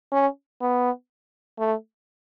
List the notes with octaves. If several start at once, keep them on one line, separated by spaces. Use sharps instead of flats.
C#4
B3
A3